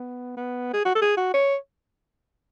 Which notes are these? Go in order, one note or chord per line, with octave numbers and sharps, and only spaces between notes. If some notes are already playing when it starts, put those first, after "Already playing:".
Already playing: B3
B3
G#4
F#4
A4
G#4
F#4
C#5